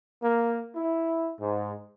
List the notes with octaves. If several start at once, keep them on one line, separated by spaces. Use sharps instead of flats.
A#3
E4
G#2